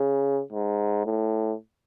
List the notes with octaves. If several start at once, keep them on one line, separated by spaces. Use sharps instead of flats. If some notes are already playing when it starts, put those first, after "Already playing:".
Already playing: C#3
G#2
A2